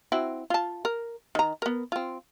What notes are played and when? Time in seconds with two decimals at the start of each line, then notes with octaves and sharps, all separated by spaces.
0.12 C4 E4 F#4
0.50 F4 A5
0.85 A#4
1.35 D#3 A#5
1.62 B3 A#4
1.92 C4 F4